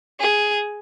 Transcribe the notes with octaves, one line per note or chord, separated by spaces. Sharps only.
G#4